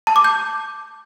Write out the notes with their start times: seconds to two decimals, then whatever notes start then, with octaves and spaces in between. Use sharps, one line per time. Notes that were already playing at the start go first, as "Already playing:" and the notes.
0.07 A5
0.16 D6
0.24 G6